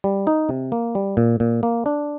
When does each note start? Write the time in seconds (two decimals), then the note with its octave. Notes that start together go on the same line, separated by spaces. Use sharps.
0.04 G3
0.27 D#4
0.49 C3
0.72 A#3
0.95 G3
1.17 A#2
1.40 A#2
1.63 A#3
1.86 D4